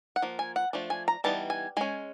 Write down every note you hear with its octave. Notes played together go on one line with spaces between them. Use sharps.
F#5
F3 A#3
G#5
F#5
F3 A3 D4
G#5
A#5
E3 G3 B3 D#4 A5
G#5
G#3 C#4 G#5